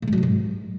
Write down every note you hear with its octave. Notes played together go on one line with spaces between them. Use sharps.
A2
G#2
F#3
C3
G#2